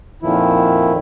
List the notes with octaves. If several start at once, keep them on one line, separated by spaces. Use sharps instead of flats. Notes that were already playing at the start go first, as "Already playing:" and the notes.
F2 A#2 D#3 F3 E4